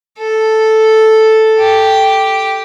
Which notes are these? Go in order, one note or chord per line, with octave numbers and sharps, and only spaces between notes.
A4
G4